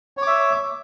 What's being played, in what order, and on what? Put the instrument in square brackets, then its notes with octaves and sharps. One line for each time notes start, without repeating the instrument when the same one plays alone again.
[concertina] C#5
D6
E5